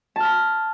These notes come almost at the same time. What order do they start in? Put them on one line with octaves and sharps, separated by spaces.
A5 F6 B5